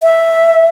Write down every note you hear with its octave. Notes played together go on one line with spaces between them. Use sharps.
E5